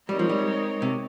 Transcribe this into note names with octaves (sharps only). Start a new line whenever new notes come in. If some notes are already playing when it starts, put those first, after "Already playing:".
G3 G#3 C4 D#4 A#4 C#5
F3
G3
C3